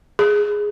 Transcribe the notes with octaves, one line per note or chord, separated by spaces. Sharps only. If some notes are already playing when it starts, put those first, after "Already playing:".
G#4